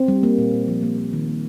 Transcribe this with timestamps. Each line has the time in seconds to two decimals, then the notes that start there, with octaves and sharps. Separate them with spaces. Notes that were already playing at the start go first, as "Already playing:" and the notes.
Already playing: C4
0.08 G3
0.23 A#3
0.38 A#2
0.53 A#2
0.68 F3
0.83 A#3
0.98 A#3
1.13 D#3
1.28 A#3